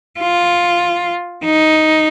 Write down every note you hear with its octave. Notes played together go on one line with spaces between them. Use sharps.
F4
D#4